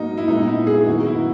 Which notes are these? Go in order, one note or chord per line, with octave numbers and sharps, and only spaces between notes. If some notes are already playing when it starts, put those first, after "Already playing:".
Already playing: G#2 F#3 A#3 D#4
E4
A#2 G#3 B3 D#4
E4
G#4
F#2 D#3 F#3 B3 F#4
E4